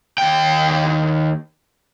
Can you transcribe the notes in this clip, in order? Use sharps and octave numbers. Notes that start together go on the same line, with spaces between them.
D#2 G5